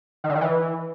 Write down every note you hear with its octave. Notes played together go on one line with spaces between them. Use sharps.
D#3
D3
D#3
E3